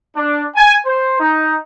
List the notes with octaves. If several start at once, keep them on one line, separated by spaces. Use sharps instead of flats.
D4
G#5
C5
D#4